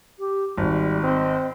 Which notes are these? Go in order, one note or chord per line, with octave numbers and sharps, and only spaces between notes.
G4
G#1 G3
C4 D#5